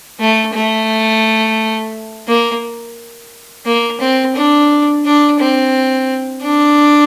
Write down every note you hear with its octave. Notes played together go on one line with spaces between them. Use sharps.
A3
A3
A#3
A#3
C4
D4
D4
C4
D4